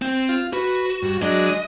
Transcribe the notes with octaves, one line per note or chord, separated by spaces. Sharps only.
C4
F4
F#4 B4
G2
F#3 G#3 D4 D#5